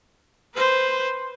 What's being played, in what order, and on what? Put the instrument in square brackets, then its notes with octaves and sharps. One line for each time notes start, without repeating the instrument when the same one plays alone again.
[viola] B4 C5